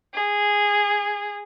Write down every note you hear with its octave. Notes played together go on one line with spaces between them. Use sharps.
G#4